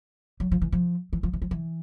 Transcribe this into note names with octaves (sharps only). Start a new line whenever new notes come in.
F#3
F3
E3
F3
E3
F3
E3
F3
E3